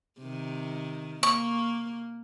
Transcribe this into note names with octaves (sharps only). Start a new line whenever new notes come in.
C3 D#3
A#3 C#6